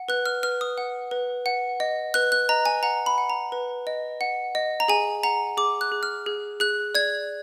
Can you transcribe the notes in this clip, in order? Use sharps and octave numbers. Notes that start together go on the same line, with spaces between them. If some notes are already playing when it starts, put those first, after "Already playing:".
Already playing: F#5
B4 F#6
F6
B4 F6
D#6
F#5
B4
F#5
D#5
B4 F#6
F#6
D#5 A#5
G#5
F#5 A#5
B5
F#5
A#5
B4
D#5
F#5
D#5
A#5
G#4 G#5
F#5 A#5
G#4 D6
F#6
G#4
F6
G#4
G#4 F#6
D5 G#6